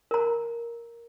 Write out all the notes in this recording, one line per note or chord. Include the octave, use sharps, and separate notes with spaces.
A#4 A#5